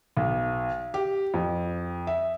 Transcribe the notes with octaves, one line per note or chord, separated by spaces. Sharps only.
B1
G4
F2
E5